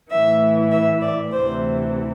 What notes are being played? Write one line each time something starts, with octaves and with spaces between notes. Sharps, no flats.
A2 E3 E5
E5
D5
D2 C3 E3 C5